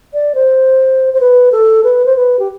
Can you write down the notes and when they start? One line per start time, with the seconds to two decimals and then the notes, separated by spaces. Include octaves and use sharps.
0.14 D5
0.35 C5
1.14 C5
1.20 B4
1.52 A4
1.84 B4
2.06 C5
2.16 B4
2.39 G4